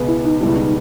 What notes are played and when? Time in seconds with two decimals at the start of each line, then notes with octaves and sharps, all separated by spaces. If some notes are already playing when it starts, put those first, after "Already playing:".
Already playing: C#2 B2 G#3 B3
0.08 E4
0.25 D#4
0.41 C#2 B2 G3 E4
0.57 D#4